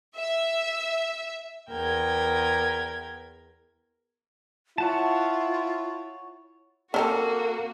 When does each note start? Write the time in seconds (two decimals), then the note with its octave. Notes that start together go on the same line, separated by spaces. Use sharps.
0.16 E5
1.70 E2 A#4 G5 G#6
4.78 E4 F4 C#5 F#5 A5
6.94 A#3 C4 C#4 D#4 F#4 G4 A4